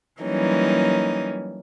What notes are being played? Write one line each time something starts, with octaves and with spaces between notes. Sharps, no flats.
E3 F#3 G3 A#3 C#4 D#4